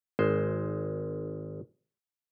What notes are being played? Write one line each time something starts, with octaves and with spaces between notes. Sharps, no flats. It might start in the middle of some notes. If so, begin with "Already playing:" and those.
G#1 G#3 C5